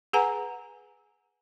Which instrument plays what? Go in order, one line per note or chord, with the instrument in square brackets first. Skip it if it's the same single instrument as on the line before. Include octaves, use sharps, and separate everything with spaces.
[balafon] G#4 B4 F#5 G#5 A#5